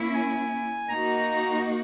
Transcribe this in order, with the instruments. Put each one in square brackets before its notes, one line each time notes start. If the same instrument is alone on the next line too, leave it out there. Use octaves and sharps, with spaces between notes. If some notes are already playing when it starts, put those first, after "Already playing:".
Already playing: [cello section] A#3 C#4 E4
[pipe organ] G#5
[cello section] A#3 D#4 F#4 [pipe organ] A#5